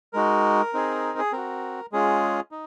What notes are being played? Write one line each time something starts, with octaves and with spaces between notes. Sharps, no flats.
G#3 D#4 F#4 A#4
C4 D#4 G#4
G#4
C4 F#4 A#4
G#3 C#4 F4 G#4
D#4